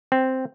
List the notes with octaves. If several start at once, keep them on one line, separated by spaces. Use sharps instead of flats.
C4